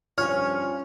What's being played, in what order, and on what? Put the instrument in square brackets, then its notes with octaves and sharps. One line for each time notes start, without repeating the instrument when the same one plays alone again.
[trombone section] G2 F3 C#4 [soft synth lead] F4 [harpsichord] C#5 [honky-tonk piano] F6